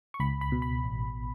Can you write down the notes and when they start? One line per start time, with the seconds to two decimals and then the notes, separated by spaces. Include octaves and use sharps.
0.14 C#6
0.20 C#2 B5
0.41 B5
0.52 B2
0.62 B5
0.84 A1